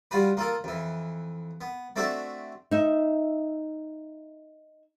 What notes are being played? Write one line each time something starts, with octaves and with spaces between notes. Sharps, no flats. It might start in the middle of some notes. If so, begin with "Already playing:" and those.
G3 F4 F#4 B4
A#3 F4 A4 A#4
F2 E3
B3
A3 C4 D4 F#4 A4 E5
D#4 E5